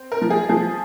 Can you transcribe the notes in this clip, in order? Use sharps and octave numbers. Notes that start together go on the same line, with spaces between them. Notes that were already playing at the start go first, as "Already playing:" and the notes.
Already playing: C4
A#4
F3
G#4
F3 G#4